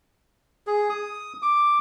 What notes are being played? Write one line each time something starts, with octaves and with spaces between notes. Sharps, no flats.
G#4
D#6
D6